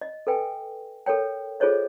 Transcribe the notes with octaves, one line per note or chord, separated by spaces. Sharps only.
D#5
A4 B4 G5 G#5
A4 A#4 C#5 G5
F4 G#4 A4 C5 C#5 D#5